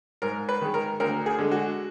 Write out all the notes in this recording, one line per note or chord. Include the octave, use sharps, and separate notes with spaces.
G#2 A#4
B4
D#3 G#3
A#4
D2 A#4
G#4
D3 G#3
F#4